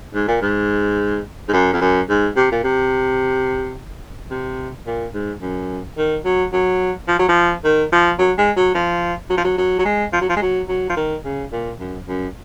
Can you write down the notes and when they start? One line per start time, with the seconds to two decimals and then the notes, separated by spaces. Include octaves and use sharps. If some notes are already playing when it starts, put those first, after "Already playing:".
0.14 G#2
0.28 A#2
0.41 G#2
1.48 G#2
1.53 F#2
1.73 F2
1.81 F#2
2.09 G#2
2.36 C3
2.52 A#2
2.64 C3
4.30 C3
4.87 A#2
5.14 G#2
5.42 F#2
5.97 D#3
6.25 F#3
6.53 F#3
7.08 F3
7.19 F#3
7.29 F3
7.64 D#3
7.92 F3
8.19 F#3
8.38 G#3
8.57 F#3
8.74 F3
9.30 F#3
9.37 F3
9.44 F#3
9.58 F#3
9.79 F#3
9.85 G#3
10.13 F3
10.21 F#3
10.29 F3
10.36 G#3
10.42 F#3
10.69 F#3
10.89 F3
10.96 D#3
11.25 C#3
11.52 A#2
11.79 F#2
12.08 F#2